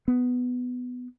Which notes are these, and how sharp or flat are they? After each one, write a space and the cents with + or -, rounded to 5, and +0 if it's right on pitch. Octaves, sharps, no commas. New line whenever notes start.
B3 +10